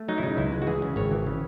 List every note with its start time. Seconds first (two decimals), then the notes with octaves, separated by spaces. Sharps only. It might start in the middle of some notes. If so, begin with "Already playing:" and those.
Already playing: A3
0.08 F#3 D#4
0.18 E4
0.23 C#3 D#4
0.37 C#2 E4
0.52 G#3
0.62 F#4
0.67 E3 G#4
0.82 C#3
0.96 G#1 C#5
1.11 E3
1.26 C#3